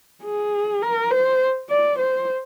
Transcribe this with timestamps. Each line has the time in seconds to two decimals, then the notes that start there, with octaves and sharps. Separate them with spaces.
0.24 G#4
0.82 A#4
1.11 C5
1.69 D5
1.98 C5